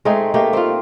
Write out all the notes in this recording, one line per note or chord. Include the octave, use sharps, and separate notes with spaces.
G#3 A3 C4 D#4
A3 A#3 G4
C4 F4